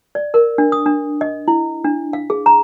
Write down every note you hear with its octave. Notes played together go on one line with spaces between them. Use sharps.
D5
A#4
D4
D#6
D4
D#5
E4
D4
F5
G#4
A#5